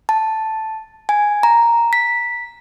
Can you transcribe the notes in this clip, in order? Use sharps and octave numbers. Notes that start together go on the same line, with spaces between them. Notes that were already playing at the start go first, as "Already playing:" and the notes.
A5
G#5
A#5
B6